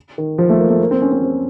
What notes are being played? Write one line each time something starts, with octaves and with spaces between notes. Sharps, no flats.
D#3
F3
A3
A#3
A3
A#3
C4
C#4
C4
C4